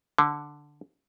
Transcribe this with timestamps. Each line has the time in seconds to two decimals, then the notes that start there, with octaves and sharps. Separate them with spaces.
0.19 D3